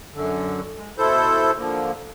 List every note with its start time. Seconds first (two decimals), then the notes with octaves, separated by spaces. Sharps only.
0.14 F#2 D3
0.78 G#3
0.98 B2 E4 A4 C5 G6
1.58 D3 F3 A#3